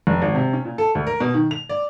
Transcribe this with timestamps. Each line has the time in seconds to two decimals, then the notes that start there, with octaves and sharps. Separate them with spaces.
0.07 F1
0.22 G#1
0.35 C3
0.53 C#4
0.65 A#2
0.78 A4
0.95 D2
1.07 A#4
1.20 B2
1.34 D#3
1.51 F7
1.69 D5